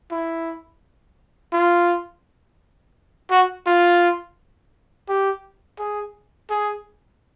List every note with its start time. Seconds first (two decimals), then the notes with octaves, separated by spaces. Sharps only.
0.11 E4
1.53 F4
3.31 F#4
3.66 F4
5.09 G4
5.79 G#4
6.50 G#4